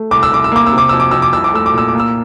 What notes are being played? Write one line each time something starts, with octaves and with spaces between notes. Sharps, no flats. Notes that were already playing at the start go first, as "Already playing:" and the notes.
Already playing: A3
C2 D6
E6
C2 D6
E6
A#3 D6
E6
C3
D6
F2 E6
D6
F2 E6
D6
C2 E6
D6
A3 E6
D6
A#2 E6
D6
A#3
E6